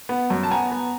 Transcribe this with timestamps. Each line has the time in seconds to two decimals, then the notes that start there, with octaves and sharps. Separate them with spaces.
0.09 B3
0.30 F#2
0.43 A5
0.51 B3 G#5 A#5
0.72 B3